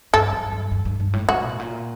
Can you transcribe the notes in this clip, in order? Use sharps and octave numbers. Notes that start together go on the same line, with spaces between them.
G2 A4
G2
G2
G2
G2
G2
A2
C3 F#4
A#2
A2
A#2